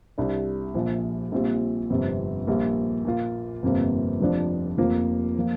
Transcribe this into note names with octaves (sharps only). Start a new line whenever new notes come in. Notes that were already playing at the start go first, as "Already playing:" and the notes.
C2 C3 G3 D4
A#1 A#2 F3
A#1 A#2 G3 C4 F4
G1 F2 C3
A#1 A#2 G3 A#3
A#2 A#3 F4
G1 F2 C3 A#3
F1 F2 F3 D4
F1 F2 F3 A#3 F4
F3 A#3